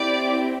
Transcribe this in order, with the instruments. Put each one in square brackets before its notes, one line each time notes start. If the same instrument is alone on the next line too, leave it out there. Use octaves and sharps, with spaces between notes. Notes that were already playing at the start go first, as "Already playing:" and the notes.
Already playing: [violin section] C4 E4 G4 D5 D6